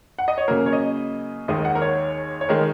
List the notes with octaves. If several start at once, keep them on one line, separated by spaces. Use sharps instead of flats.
F#5
D#5
C#5
C#3 F#3 A#3 A#4
C#5
D#5
D#2 D#3 G#3 D#5
F#5
A#4
C#5
C#5
D#3 G#3 A#4